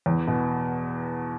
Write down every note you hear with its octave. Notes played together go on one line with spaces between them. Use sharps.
E2
B2